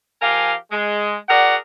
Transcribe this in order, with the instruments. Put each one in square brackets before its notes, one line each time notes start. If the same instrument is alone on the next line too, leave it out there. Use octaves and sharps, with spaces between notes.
[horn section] F3 G4 A#4 F5 G#5
G#3
F#4 G#4 A#4 D5 F#5